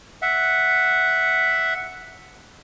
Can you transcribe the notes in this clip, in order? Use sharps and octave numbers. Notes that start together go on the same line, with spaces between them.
E5 F#5